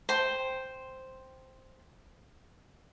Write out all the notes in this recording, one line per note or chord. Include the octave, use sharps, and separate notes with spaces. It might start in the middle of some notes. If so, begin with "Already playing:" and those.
C5 G5